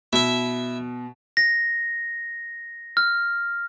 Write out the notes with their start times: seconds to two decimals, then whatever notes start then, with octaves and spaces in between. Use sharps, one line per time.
0.13 B2 E4 E5
1.37 A#6
2.97 F6